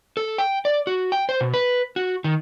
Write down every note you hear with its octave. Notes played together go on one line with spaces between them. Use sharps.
A4
G5
D5
F#4
G5
C5
B2
B4
F#4
D#3